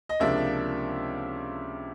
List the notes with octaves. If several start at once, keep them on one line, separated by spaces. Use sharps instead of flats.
D#5
C#2 C3 F3 A#3 D4 E5